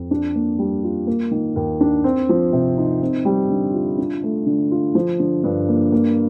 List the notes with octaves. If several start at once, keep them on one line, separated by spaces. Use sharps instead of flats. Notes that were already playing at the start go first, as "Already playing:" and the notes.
Already playing: F2
D4
A#3
G3
F4
A#3
D#3
D#2
D4
C4
F3
C3
D#4
C4
G3
D3
F4
D4
A3
D3
F4
F3
D3
G2
A#3
A#3